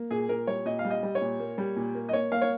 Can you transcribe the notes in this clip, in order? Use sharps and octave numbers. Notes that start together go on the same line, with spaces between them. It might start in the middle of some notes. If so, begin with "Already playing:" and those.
Already playing: A#3
A#2 G#4
A#2 A#4
G3 C#5
A#2 D#5
F5
G3
D#5
G3
C#5
A#2
A#3
G3
A#2
A#3
D#5
A#3 C#5
A#3 F5
C#5